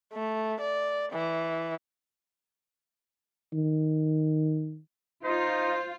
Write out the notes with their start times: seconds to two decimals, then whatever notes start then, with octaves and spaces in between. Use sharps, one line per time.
0.13 A3
0.60 D5
1.12 E3
3.53 D#3
5.24 D#4 F4 C5